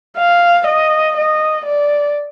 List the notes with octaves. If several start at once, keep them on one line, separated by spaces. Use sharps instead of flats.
F5
D#5
D#5
D5